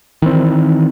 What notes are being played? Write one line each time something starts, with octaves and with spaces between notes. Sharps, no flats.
D#3 E3 C4